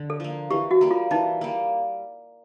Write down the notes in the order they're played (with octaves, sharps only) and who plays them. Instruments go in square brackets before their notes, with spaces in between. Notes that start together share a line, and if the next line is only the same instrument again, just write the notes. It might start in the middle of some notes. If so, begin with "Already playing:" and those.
Already playing: [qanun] D3
[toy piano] A4
[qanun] F3 A#3
[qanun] E3 [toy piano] G4
[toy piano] F#4
[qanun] G3 A#3
[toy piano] F4
[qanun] E3 [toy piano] D#4
[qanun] G3 A#3